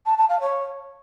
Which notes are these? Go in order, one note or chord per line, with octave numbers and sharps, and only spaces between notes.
A5
A5
F5
C#5